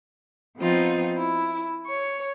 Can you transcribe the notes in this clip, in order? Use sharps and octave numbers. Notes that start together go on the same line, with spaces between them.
F3 B3 C4 D#4 F4
E4
C#5 C#6